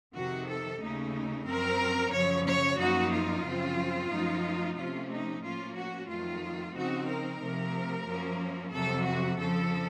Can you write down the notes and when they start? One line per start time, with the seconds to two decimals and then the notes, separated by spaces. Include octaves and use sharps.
0.14 F2 C3 D#3 F#4
0.47 A4
0.80 D#2 C#3 A3 D#4
1.46 F#2 F3 C4 A#4
2.12 F#2 C#3 F3 C#5
2.45 C#5
2.78 F#2 F3 A#3 D#4 F#4
3.11 F4
3.44 F#2 C#3 F3 C4
4.10 F#2 F3 A3 D#4
4.76 C3 F3 A3 C#4 F4
5.10 D#4
5.42 A2 F3 A#3 C#4 F4
5.75 F#4
6.08 F2 D#3 F#3 A3 F4
6.74 C#3 F3 C4 D#4 F#4
7.08 A#4
7.40 C3 F3 A3
8.06 F#2 F3 A#3 C#4
8.72 F2 C3 F#3 A4
9.05 F#4
9.38 F2 C#3 F3 A4